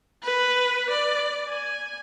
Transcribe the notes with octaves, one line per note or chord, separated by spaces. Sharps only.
B4
D5
G#5